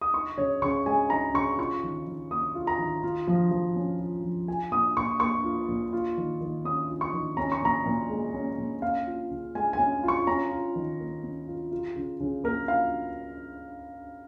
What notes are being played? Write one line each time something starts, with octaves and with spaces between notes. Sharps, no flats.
D#6
D#4 C#6
C#3 C#5
C#3 C#6
G#3 G#5
D#4 A#5
C#3 C#6
F4 C#6
D#3
D#3
A#3 D#6
F4
A#5
D#3
F4
F3
F3
C#4
F4
F3
F4 G#5
A#2 D#6
A#2 C#6
A#3 C#6
F4
A#2
F4
D#3
D#3
C#4 D#6
F4
C#6
D#3
C#4 A#5
C#6
A#2 A#5
A#2
G#3
C#4
A#2
C#4 F5
F4
C#3
G#3 G#5
G#5
C#4
F4
C#6
C#4 A#5
F4
D#3
A#3
C#4
F4
F4
C#3
C#3
A#3 A#4
F4 F5